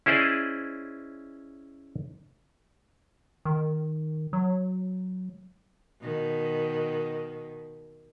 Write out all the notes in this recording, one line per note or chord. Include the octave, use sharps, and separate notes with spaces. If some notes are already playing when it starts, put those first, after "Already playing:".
C#4 E4 G#4 C5 D5 D#5
D#3
F#3
B2 D#3